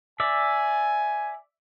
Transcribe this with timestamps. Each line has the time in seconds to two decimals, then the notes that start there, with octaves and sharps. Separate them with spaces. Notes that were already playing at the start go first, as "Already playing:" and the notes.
0.20 D5 E5 G#5